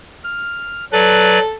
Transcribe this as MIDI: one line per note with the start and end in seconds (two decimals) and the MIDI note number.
0.24 0.85 89
0.93 1.39 54
0.93 1.56 69
0.93 1.39 71
0.93 1.39 74